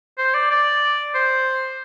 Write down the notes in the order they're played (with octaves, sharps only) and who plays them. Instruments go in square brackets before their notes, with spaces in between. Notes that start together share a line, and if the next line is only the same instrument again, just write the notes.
[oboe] C5
D5
D5
C5